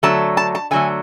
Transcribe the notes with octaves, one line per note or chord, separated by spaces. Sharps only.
D3 F#3 A3 A5
A5
A5
D3 F#3 A3 G#5